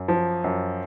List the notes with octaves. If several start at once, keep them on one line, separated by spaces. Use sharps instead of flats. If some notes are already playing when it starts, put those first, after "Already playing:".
Already playing: F#2
F3
F#2